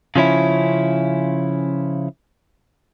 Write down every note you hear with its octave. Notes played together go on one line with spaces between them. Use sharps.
C#3 F3 C#4 E4